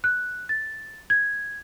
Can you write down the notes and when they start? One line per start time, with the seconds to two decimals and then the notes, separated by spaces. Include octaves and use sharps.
0.04 F#6
0.49 A6
1.10 G#6